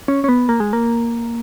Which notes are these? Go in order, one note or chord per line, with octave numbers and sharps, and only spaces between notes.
C#4
C#4
B3
A#3
G#3
A#3